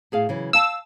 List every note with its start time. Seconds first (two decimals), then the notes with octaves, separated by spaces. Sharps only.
0.12 A2 G#4 F5
0.29 C#3 E3 F#3
0.53 F5 A5 E6